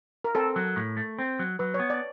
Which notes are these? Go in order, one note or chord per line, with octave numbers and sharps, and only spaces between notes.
A#4
C4 A4
F#3
A2
A3
C4
F#3
F#3 B4
C#5
B3
D5